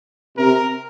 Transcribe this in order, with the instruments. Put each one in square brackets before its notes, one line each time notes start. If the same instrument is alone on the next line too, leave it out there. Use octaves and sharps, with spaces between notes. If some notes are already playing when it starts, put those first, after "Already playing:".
[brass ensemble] C3 [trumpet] A#4